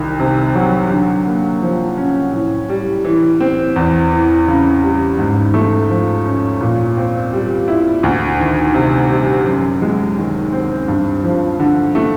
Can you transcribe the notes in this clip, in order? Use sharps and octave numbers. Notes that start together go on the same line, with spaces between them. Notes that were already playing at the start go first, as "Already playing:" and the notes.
Already playing: C2 D#3
C3
F#3
D3
A#3
F3
C#4
A2
G3
E3
C4
E2
E3
C#3
G3
G#2
A3
F3
C#4
A#2
C4
G3
E4
D2
D#3
C3
G3
F#2
G#3
D#3
C4
G2
F3
D3
A3